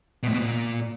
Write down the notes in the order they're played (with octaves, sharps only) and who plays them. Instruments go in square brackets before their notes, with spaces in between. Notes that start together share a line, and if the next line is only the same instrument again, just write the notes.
[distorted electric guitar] B2
A2
B2
A#2